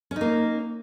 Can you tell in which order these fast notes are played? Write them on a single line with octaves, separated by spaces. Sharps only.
C#4 D#4 A#3